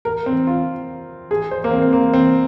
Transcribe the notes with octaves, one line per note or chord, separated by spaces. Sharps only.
A#4
C4
F4
G#4
C5
A#3
C4
C4
A#3
C4